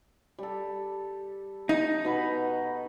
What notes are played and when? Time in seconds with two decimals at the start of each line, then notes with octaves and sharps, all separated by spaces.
0.38 G3 A4
1.69 D#4
2.05 B2 B3 B5